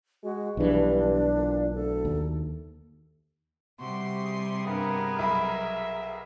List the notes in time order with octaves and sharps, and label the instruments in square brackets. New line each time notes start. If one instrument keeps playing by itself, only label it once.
[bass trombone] G#3 [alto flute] F#4
[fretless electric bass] B1 E3 [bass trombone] G2 [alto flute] D4
[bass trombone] A#2
[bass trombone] D2 [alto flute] A4
[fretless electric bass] D#2
[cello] C3 G3 [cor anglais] F#4 [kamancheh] C6
[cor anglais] G#4
[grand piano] G2 [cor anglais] B3 [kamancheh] G#4 A#4
[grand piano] B1 B5 [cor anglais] E5